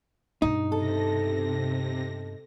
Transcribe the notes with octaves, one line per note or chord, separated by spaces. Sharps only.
G2 B2 D#4
C3 A4 A#6